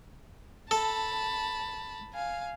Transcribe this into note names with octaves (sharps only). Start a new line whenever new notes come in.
A4 A5 B5
F5 G#5